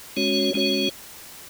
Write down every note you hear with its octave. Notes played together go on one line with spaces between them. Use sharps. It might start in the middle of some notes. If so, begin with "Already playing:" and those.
G#3 C#4 F#4 C#5
G#3 C#4 F#4 C#5